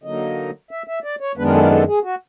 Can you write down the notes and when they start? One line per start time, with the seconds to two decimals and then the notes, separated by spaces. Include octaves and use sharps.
0.03 D3 F#3 A#3 D#4 D#5
0.71 E5
0.88 E5
1.04 D5
1.20 C#5
1.37 F#2 D#3 G#3 B3 D4 B4
1.45 A#4
1.54 A4
1.63 A#4
1.71 A4
1.87 G#4
2.04 F#4